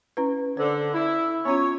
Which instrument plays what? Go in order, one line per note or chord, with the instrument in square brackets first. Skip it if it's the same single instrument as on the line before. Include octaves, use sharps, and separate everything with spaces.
[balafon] C#4 E4 B4
[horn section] D3 [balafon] C5
[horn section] E4
[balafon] B3 C#4 F4 [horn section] C#5